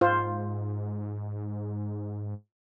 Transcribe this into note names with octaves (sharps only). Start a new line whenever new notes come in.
G#2 F4 C5